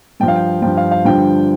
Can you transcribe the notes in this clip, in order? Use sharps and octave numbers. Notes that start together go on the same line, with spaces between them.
G2 F3 G5
F5
G5
G2 F3 G5
F5
F5
G2 D3 F3 G5